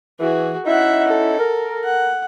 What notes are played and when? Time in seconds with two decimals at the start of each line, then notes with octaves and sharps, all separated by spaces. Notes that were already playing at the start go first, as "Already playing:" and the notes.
0.20 E3 F#4 G#4
0.66 C#4 D#4 E4 E5 F#5
1.08 A4
1.39 A#4
1.84 F#5